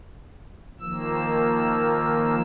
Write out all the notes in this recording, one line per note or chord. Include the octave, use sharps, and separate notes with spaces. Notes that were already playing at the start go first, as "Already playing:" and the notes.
D#3 F3 A#3 E6